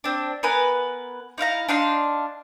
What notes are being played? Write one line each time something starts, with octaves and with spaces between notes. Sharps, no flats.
C4 D4
B3 A#4 B4 G#5
D#4 E4 F5 A#5
D4 D#4 F5 C6